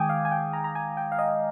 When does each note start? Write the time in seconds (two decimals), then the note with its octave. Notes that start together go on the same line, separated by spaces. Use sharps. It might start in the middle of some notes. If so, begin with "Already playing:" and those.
Already playing: D#3 G#3 G5 G#5 D6 D#6
0.09 F5
0.25 G#5
0.31 G5
0.53 A#5
0.64 A#5
0.75 G#5
0.97 G5
1.12 F5
1.19 D#5